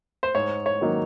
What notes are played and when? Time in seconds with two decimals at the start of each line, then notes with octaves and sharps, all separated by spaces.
0.23 C5
0.35 G#2 C#5
0.66 C#5
0.81 D#3 F#3 A#3 D#4